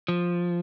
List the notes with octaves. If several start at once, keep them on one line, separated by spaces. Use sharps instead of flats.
F3